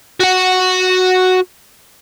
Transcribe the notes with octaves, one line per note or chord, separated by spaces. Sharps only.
F#4 F#5